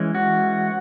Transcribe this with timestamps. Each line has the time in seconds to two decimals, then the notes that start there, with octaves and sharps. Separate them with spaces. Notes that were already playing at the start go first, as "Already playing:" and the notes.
Already playing: E3 G#3 C#4
0.15 F#4